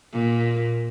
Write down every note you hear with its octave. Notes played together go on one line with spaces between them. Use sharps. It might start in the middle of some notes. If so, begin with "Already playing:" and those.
A#2